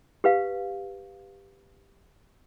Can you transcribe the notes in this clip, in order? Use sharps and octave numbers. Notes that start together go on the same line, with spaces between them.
G4 B4 F5